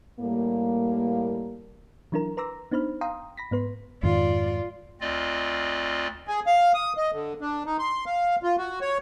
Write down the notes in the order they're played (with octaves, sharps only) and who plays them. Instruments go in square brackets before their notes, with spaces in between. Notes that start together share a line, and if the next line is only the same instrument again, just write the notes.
[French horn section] A2 G3 A#3
[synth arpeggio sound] E3 F#3 D4 E4 A#4 A#5
B4 A#5 C6 D6 E6 A#6
B3 D4 D#4 C5 B5 F6
F5 G5 A#5 C6 D#6
B5 A#6 B6
G#2 B3 B4 C6
[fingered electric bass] F2 G#2 D#3 [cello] F4 D5
[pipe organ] D2 C4 F4 D5 D#5
[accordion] G#4
F5
D#6
D#5
D3
D4
D#4
C6
F5
F4
F#4
C#5